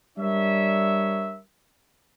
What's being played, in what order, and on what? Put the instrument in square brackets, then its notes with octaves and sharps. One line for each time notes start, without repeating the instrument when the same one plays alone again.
[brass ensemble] G3 D4 A#4 C#5 E5